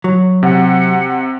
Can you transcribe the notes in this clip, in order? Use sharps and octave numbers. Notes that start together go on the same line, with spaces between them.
F#3
C3 F#5